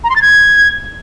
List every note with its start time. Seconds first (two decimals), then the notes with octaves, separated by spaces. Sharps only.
0.04 A#5
0.10 C6
0.16 A6
0.22 G#6